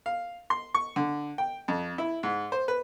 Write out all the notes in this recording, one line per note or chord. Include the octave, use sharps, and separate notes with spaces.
F5
C6
C#6
D3
G5
F2
E4
G#2
C5
B4